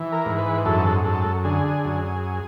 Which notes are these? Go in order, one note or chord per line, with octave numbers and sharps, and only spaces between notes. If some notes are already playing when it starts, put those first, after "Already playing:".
Already playing: E3
A#4
G#2
B4
F#2 A4
F#2 A4
D3 G#4
F#2